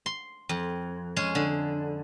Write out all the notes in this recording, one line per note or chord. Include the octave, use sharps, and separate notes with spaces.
C6
F2
G#3 C#4 G#4
D3